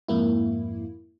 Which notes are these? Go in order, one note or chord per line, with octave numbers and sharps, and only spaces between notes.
F2 G#2 A#3 E4